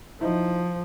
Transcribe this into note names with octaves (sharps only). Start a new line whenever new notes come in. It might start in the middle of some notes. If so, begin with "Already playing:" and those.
F3 D#4 E4